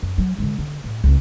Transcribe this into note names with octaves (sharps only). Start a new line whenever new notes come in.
F#2
F#3
D3 G#3
D3
A2
C#2 A3